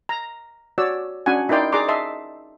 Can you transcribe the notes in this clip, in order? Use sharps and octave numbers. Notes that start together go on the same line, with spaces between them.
A#5
F#4 C#5 D5 E6
C#4 D4 F#4 F#5 G#5
D#4 E4 A#4 D5 G5 C6
G#4 D5 A#5 C6 D6
D#5 E5 A5 C6